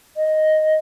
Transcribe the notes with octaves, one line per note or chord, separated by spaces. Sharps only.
D#5